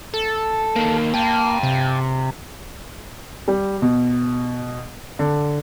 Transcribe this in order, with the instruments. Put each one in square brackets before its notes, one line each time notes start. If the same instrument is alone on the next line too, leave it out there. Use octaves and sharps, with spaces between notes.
[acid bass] A4
[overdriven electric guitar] D#3 A#3
[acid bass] A#3 [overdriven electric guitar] G5 A5
[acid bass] C3
[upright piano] G3
B2
D3